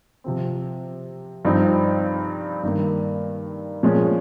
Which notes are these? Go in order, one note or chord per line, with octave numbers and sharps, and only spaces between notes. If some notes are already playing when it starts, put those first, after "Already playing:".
C3 F3 C4
G2 F3 C4 D#4
G2 D#3 A#3
A#2 F3 G#3 C#4